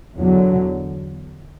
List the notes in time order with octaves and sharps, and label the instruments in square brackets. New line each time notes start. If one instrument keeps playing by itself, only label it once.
[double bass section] E2 D3 F#3